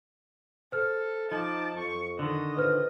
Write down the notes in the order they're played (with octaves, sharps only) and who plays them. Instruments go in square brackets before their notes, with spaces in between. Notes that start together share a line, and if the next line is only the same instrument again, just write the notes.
[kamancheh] A4 [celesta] C5 F6
[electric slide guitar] F3 [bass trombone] D#4 [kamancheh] A5 D6
[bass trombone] F2 [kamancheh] C#6
[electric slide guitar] D3 D#3 [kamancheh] D#5
[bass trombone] A#2 [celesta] B4 C5 F6